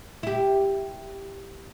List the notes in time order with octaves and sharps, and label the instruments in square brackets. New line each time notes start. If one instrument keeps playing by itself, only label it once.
[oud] E4 G4